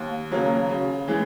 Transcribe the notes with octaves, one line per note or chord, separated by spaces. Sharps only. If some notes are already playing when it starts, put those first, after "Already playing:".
Already playing: D#2
C#3 F#3 A#3
C#3
E3 G#3